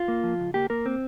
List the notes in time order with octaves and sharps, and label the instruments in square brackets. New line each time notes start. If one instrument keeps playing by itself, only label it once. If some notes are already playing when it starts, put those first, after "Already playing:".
Already playing: [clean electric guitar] F4
A#3
F3
C#2
A#3 G4
A#3 A#4
C4